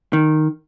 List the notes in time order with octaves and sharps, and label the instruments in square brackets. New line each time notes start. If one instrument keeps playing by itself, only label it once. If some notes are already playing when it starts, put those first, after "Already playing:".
[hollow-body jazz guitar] D#3